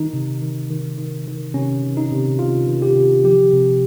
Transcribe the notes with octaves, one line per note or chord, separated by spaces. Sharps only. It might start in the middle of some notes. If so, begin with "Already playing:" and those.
Already playing: D#3 D#4
C3
D#3
D#3
D#3
D#3
C3 C#4
D#3
D#4
C3
C3 F4
D#3
G4
C3
F3 G4
C3